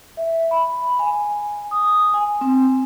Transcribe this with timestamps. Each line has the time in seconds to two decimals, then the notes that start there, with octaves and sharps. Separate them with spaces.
0.17 E5
0.51 B5
0.99 G#5
1.71 D#6
2.14 G#5
2.41 C4